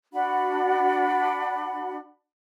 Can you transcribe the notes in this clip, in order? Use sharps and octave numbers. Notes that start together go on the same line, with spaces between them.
D4 F#4 F#5 B5